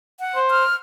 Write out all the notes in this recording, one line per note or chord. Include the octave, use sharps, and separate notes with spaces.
F#5
C5
F6